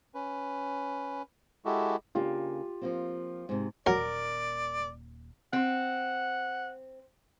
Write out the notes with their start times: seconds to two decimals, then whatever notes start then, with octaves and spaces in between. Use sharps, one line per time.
0.15 C#4 B4
1.65 G#3 E4 F#4 G4 A4
2.15 C#3 A#3 D4 F4 G4
2.81 F3 A#3 C4
3.49 G#2 C3
3.86 D#1 F#3 A#3 A#4 D5
5.53 C4 F#5